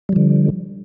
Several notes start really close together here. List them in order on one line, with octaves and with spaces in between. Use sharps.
G3 F3 D3